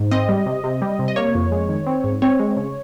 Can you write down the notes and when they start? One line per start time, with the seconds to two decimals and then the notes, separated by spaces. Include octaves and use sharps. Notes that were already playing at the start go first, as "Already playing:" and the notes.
Already playing: G#2
0.11 C4 D#5
0.29 G3
0.46 C3
0.64 C3
0.82 G3
0.99 C3
1.08 D#5
1.16 A#3 C#5
1.35 F2
1.52 G#3
1.69 D#3
1.86 C4
2.04 G#2
2.22 C4 C#5
2.39 G#3
2.57 C#3